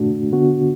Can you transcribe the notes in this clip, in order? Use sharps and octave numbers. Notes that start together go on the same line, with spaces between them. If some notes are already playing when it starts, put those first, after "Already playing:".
Already playing: A2 A3 D4 F#4
D3 B3 D4 F#4